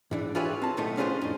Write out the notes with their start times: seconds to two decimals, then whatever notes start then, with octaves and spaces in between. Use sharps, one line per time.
0.11 G#2 E3 D4
0.35 F4 G4 G#4 B4 C#5 E5
0.62 C4 A5
0.77 B1 A2 D#3 A3 B3
0.97 C#4 D4 F4 G#4 B4 C5
1.21 F2 A2